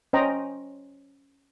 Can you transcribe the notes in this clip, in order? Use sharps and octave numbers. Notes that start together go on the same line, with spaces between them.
C#4 C5 D#5 G5 A#5